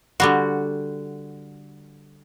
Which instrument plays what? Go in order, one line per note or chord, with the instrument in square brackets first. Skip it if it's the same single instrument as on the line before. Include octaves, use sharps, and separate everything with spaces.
[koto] D3 G3 F#4